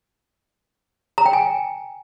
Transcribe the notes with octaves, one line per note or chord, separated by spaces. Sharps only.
A#5
G5
G#5